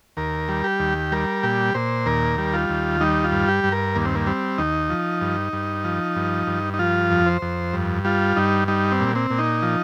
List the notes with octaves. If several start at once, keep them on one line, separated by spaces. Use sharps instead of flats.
D#2 A#4
G3
G4
D#2
G3 A#4
A#2 G4
A#2 C5
D#2 A#4
G3
F4
D#2
G3 D#4
F4
G2
G4
G2
A#4
D#2 A#3
C4
A#3
G3 C4
D#2 D#4
F3
G2
G2
F3
G2
G2
D#4
F3 F4
F2
C5
F2
G2
G3 F4
G2 D#4
G3 D#4
C4
A#2
C4
A#2
D#4
F3